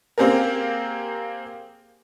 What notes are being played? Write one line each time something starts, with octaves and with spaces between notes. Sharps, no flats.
A#3 C4 G4 G#4 A#4